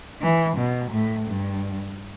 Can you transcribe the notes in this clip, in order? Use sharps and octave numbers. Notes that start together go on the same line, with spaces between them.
E3
B2
A2
G2